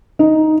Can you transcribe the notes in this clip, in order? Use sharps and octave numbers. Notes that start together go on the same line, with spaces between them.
D#4